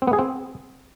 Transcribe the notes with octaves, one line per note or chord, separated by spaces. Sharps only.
C4
B3
G#4
C4